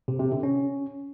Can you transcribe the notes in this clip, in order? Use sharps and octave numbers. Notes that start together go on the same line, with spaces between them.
C3
C3
D3
C#4